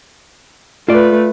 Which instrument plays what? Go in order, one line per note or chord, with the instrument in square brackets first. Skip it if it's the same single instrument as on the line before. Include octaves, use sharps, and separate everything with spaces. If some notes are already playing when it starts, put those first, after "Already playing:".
[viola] A3 B4 [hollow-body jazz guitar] F4 D5